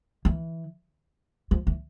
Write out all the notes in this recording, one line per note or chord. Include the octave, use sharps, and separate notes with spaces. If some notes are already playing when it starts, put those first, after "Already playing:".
E3
F3
E3